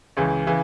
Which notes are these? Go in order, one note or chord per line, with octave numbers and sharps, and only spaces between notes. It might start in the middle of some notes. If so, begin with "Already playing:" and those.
C#2 C#3 E3
C#3 E3